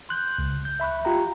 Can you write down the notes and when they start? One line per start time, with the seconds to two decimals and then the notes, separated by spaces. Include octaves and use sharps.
0.09 C6 F#6 G6
0.38 C#2
0.65 G6
0.80 E5 B5 C#6 F#6
1.05 F4 G4 G5 A#5